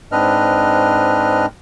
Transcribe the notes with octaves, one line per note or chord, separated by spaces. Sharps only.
G#2 C4 D4 B4 D#5 F6